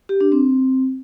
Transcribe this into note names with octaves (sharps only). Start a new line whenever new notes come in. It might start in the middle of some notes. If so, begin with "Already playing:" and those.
G4
D4
C4